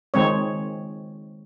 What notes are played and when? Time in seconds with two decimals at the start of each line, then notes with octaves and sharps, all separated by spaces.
0.14 D#3 G#3 C4 C#5